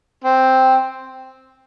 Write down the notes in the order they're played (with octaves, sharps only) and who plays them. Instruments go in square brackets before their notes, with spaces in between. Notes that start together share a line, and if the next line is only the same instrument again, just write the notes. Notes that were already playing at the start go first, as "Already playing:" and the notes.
[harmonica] C4